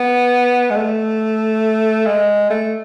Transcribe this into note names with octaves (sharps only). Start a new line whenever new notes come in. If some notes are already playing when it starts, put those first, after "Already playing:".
Already playing: B3
G#3
A3
G#3
A3